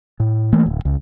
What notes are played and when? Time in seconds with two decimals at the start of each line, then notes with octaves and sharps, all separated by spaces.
0.20 A2
0.53 E3 A3 A#3
0.66 D1
0.85 C#2